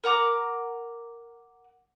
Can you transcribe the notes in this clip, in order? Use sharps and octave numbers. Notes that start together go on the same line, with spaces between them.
A#4 F#5 A#5 D6